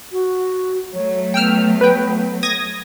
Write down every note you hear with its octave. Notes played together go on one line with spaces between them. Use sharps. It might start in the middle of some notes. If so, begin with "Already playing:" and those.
F#4
F#3 A3 C#5
B3 G5 E6 F6
B4 G5
D#6 G#6 A#6